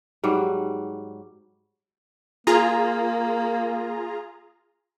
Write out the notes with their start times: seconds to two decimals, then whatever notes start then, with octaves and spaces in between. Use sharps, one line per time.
0.23 G#2 F#3 G3
2.47 A#3 F4 G#4 A#5